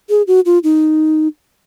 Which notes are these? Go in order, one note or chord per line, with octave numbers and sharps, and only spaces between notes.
G#4
F#4
F4
D#4